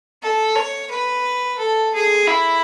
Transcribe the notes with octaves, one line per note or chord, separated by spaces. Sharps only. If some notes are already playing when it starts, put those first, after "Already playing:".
A4
C#5
B4
A4
G#4
E4